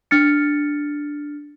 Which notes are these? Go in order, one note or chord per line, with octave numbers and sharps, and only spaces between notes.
D4 F6 A6 C#7